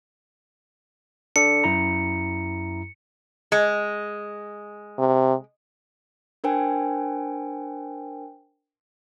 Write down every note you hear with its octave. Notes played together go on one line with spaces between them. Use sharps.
D4 A4 D5 C#7
F#2 E4 A#5
G#3
C3
D4 A#4 C5 G5 G#5